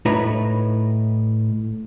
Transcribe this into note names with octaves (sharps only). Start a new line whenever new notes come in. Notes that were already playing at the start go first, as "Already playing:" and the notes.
A2 D#4 E4 B4 C#5 A#5